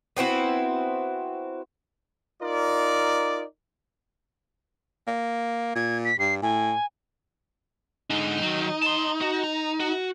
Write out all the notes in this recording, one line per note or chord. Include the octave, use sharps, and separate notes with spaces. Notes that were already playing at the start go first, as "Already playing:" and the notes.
B3 C4 E4 F#4
D#4 F4 A#4 D5
A#3
A#2 G#6
B6
G2 C7
A2 G#5
G#2 D3 D#4
D#3 F#3
A5 C6
F#4
A#5
F#4